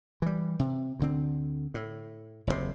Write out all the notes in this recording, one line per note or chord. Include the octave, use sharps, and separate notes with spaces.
E3 G3
C3
D2 D3 C4
A2
F#1 E2 G2 C3